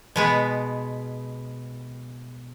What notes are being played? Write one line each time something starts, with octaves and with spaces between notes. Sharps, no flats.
B2 G#3 B3